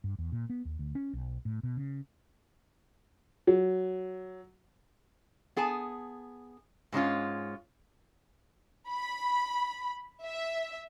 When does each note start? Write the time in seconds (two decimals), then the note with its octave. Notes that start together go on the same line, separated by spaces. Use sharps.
0.04 G2
0.19 E2
0.32 A#2
0.50 B3
0.65 D#2
0.79 D2
0.95 C#4
1.13 B1
1.45 A2
1.63 B2
1.77 C#3
3.47 F#3
5.56 B3 G#4 G#5 A5
6.92 G#2 G#3 C#4 F4
8.90 B5
10.25 E5